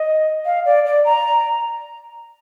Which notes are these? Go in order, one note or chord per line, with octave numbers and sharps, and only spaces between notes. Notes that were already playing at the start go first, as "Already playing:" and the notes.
Already playing: D#5
F5
D5
D5
A#5